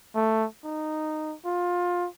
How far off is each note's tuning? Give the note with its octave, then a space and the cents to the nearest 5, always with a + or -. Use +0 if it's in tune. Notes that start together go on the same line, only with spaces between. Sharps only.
A3 +5
D#4 -10
F4 +20